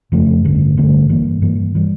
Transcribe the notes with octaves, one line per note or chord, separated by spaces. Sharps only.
F2 C#3 F3 A3
A1 G2 D3 A3
A1 G2 D3 A3
G2 E3 A#3
G2 E3 A#3
E3 G3